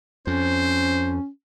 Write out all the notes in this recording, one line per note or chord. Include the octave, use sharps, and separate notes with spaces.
F2 C#4 C5